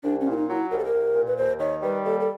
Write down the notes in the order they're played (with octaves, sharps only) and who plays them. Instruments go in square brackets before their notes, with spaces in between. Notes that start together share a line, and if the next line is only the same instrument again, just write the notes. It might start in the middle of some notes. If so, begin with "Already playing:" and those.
[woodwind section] C2 [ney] D4
[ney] C#4
[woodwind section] A#2 [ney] E4
[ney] D#4
[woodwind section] F#3 [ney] F4
[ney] E4
[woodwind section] C2 [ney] A#4
[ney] A4
A#4
[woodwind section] C2
A#2
[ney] B4
[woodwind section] D#2 [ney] C5
[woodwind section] D#3 [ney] C#5
[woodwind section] G3 [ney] B4
[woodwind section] D#2 [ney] A4
[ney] A4